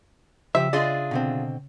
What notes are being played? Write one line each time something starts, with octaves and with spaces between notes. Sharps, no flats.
C#3 F3 G4 E5 C#7
D4 F4 G#4 D5 D#5
B2 D3 C4